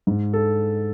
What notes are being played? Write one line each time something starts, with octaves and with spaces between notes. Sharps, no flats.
G#2
A4